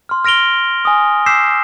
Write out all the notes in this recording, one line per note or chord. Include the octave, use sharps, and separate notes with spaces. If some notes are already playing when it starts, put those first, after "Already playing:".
C6 F6
F6 A#6 D7 F7 G7
G#5 D#6
D6 E6 G6 B6 C7 E7